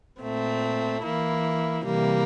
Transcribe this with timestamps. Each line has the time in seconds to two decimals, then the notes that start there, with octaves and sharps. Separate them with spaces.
0.21 A#2 A3 C4
1.03 E3 A#3 E4
1.85 C3 E3 G3 A#3